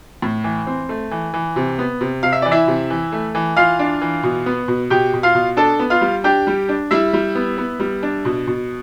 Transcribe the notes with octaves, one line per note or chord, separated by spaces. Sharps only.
A2
E3
C4
A3
E3
E3
C3
B3
C3
C3 F5
E5
E3 D5
E4 E5
C3
E3
A3
E3
E3 F4 F5
D4
E3
B2
B3
B2
B2 G4 G5
B2
F4 F5
B2
D4 A4 A5
B3
F4 F5
G3
D4 G4 G5
G3
D4
G3 E4 E5
G3
B3
B3
G3
D4
B2
B2